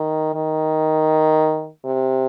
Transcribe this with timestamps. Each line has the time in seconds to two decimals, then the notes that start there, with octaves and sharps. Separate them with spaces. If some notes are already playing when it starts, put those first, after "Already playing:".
Already playing: D#3
0.34 D#3
1.85 C3